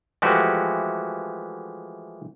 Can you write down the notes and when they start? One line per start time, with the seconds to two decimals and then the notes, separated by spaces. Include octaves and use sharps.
0.22 E3 F3 G#3 A3 F#4 G4